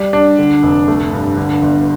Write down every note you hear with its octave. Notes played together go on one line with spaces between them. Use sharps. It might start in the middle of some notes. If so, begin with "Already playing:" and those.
Already playing: G3
D4
D3
F1
A3
G2
D3
G1